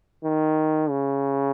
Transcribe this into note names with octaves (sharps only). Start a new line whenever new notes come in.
D#3
C#3